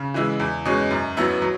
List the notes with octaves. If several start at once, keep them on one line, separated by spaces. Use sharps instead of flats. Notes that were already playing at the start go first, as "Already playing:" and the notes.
Already playing: C#3
E3 G#3 E4
E2
B2 G#3 C#4
F#2
F#3 B3 E4
F#3